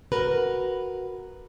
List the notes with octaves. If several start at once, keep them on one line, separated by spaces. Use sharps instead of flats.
F#4 A#4 B4